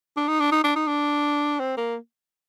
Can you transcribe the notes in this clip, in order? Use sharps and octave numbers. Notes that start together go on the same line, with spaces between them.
D4
D#4
D4
D#4
D4
D#4
D4
C4
A#3